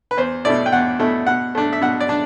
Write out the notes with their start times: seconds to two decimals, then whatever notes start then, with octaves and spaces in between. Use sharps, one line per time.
0.11 B4
0.17 E2 C5
0.45 B2 A3 E4 D5
0.66 G5
0.72 E2 F#5
0.99 B2 A3 E4
1.27 B2 F#5
1.55 A3 D4
1.73 E5
1.81 B2 F#5
2.01 D5
2.09 D4